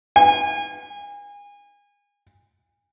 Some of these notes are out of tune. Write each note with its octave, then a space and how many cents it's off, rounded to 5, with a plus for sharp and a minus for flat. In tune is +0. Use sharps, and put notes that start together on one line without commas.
G#5 -30